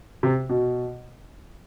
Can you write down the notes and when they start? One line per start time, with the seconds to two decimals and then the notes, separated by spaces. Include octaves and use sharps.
0.23 C3
0.49 B2